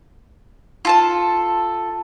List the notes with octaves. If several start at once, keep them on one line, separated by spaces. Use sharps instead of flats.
F4 A4 A5